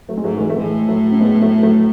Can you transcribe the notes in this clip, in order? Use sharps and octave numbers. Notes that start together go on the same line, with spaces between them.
F#3 A3
G#3
G#2 F#3 A3
A3
E3 G#3
A3
A2 E3 G#3
F#3 A3
C#4
G#3 B3
F#3 A3
F#3 A3